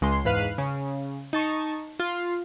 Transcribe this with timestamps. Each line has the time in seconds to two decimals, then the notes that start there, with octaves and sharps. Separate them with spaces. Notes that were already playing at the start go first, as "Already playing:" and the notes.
0.01 C#2 G#3 C6
0.25 E2 G#2 B4 F5 F#6 D#7
0.58 C#3
1.33 D#4 A5 C#6
1.99 F4